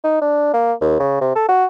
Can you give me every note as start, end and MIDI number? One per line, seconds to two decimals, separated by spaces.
0.04 0.22 63
0.22 0.52 62
0.54 0.73 58
0.81 0.98 39
1.00 1.22 49
1.22 1.32 48
1.36 1.48 69
1.49 1.66 66